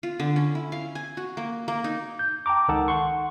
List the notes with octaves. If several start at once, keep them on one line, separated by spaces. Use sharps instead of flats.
F4
D3
C#4
E4
F5
G#5
F#4
A#3
A#3
D#4
G6
G5 A5 A#5 D6
C#2 D#3 D#4 A4 F#5 A5
F#5 C6 C#6